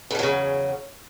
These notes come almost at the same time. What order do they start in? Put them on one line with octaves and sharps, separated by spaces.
E2 F3 F#3 C#3